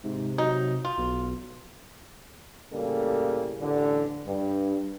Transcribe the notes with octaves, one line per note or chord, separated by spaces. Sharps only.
G#2 C3
F#3 D#4
F4
B1 B2
A2 C#3 G3 A#3 A4
A1 D3
G2